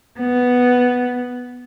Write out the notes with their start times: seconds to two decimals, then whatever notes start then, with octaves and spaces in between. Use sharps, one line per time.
0.20 B3